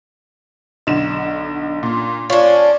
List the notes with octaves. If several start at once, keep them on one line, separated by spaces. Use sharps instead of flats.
B1 D3 E7
A#2
C#4 D4 F4